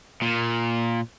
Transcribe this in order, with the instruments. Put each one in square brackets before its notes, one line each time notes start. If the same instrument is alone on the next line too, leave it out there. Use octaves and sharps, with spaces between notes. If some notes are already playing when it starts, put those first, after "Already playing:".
[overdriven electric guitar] A#2